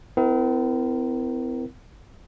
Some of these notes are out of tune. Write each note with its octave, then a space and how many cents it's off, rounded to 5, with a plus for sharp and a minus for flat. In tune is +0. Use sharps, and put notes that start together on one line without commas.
C4 -40 E4 +0 A#4 +0